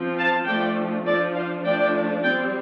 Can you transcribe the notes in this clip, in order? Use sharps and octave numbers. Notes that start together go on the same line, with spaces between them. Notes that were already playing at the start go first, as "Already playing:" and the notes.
Already playing: F3 C4
F5 A5
F3 A3 D4 D5 G5
F3 D4 A4 D5
C5 F5
F3 A3 D4 D5 G5
G3 C4 D5 G5